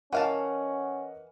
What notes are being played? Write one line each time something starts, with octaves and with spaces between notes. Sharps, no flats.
E3 C#4 A#4 D#5 F5 F#5 A5